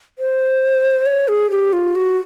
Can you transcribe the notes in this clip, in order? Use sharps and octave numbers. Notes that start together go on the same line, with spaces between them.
C5
C#5
G#4
G4
F4
F#4